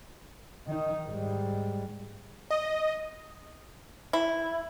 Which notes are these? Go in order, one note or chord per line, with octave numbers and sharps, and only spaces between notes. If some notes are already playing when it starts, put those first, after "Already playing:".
D#3 D#4
G#2 G3
D#5
E4